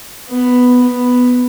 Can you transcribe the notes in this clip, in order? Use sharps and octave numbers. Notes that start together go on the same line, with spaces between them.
B3
B3